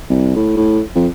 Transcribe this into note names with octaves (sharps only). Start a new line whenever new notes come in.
C2
A2
A2
F2